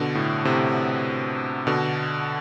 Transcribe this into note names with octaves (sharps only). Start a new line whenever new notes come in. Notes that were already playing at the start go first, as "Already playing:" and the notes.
Already playing: B2 D3
A2
A2 C3
B2 D3